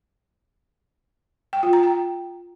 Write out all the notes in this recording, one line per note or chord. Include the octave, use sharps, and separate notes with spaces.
G5
F4
A#5
G5